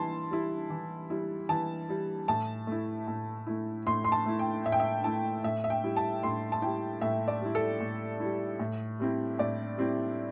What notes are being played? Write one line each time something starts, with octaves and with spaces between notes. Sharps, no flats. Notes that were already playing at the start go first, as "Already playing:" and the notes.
Already playing: E3 G3 E4 A5 C6
G3 E4
E3
G3 E4
E3 A5
G3 E4
A2 A5
A3 E4
A2
A3 E4
A2 C6
C6
A5
A3 E4
G5
A2 E5
G5
E5
A3 E4 A5
A2 E5
E5
G5
G3 E4
A5
A2 C6
A5
G3 E4 G5
A2 E5
D5
G3 E4
A4
A2
G3 E4
A2
G3 C4 E4
A2 D5
G3 C4 E4